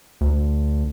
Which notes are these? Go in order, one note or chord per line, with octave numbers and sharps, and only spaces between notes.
D2